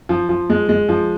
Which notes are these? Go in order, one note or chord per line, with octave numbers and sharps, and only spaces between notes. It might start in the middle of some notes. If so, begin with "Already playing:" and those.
F3
F3
G#3
G#3
F3